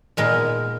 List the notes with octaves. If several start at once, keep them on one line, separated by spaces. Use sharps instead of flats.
A#2 G#3 B3 D#4 A#4